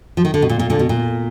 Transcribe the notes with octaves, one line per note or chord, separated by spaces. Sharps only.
F3
D#3
D3
B2
A#2
A#2
A#2 D3
B2
A#2